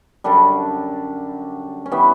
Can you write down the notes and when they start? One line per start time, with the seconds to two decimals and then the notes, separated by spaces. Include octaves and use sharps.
0.24 F#2 D3 G3 D4
1.86 C#4
1.92 E3 G3 B3